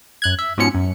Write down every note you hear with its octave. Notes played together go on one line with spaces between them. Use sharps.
F#2 F#6 G#6
E5
G#2 B2 F3 C#4 C#7
F#2